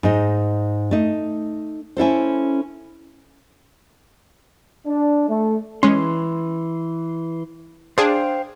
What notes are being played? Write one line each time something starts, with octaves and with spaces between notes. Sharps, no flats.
G#2 D#4
A3 D#4
C#4 E4 A4 C5
D4
A3
E3 G#3 C#4 C6
D4 G#4 C5 F5 G5